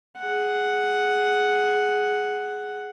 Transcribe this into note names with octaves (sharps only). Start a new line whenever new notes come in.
G#4 F#5